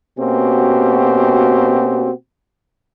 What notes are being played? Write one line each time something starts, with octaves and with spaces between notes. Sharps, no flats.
B2 A#3 C4 C#4 F#4 G4